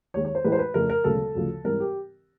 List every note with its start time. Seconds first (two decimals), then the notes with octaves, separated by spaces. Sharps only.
0.14 D#2 D#3 G#3 C#5
0.25 C#5
0.35 C5
0.44 A1 A2 E3 G#3 B4
0.52 C5
0.59 B4
0.74 F2 C#3 F3 A3 A#4
0.90 A#4
1.04 E1 D2 C#3 F#3 A4
1.35 D2 C#3 F3
1.64 G#2 E3 G3 C4 A#4
1.80 G4